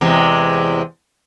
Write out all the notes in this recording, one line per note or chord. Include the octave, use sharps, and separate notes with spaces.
E2 C3 G#3